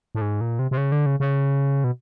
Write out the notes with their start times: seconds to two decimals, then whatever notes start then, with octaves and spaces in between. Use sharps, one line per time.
0.15 A2
0.21 G#2
0.41 A#2
0.59 C3
0.71 C3
0.77 C#3
0.92 D3
1.06 C#3
1.20 C#3
1.84 B2